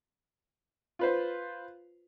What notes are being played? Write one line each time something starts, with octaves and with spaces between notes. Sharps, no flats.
F4 B4 C5